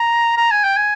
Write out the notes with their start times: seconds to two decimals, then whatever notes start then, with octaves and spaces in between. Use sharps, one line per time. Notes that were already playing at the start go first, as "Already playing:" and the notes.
Already playing: A#5
0.37 A#5
0.51 G#5
0.64 G5
0.77 G#5